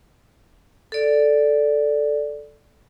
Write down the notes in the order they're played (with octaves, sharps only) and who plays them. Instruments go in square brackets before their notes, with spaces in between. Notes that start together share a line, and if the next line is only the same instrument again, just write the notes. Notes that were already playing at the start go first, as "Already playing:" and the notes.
[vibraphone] A4 D5